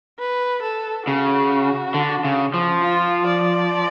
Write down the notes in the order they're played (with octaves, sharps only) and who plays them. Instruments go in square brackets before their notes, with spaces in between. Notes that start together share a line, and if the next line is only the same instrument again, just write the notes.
[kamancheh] B4
A4
[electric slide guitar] C#3 [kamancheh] F#4
[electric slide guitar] D3
C#3
F3
[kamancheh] F4
D5